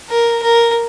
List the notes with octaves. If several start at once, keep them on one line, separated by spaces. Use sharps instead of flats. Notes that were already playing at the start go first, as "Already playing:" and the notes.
A#4
A#4